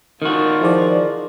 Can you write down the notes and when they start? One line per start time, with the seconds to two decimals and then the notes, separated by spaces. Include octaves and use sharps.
0.22 D#3 F4 F#4 A#4
0.62 F3 E4 G#4 D5